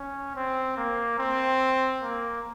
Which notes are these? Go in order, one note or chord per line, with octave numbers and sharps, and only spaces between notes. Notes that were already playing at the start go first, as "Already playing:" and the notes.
Already playing: C#4
C4
A#3
C4
A#3